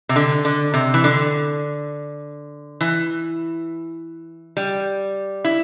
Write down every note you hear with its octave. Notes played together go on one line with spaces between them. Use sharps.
C3
D3
D3
C3
E3
D3
E3
G3
E4